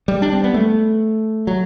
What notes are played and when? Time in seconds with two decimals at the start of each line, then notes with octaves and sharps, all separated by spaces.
0.08 G3
0.22 D4
0.33 C4
0.44 B3
0.54 A3
1.47 F#3